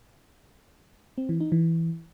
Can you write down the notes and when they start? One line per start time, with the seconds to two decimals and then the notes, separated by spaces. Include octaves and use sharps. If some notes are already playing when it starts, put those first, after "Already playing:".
1.18 C4
1.29 E3
1.40 D#4
1.52 E3